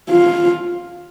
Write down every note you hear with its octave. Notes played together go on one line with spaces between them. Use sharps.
F4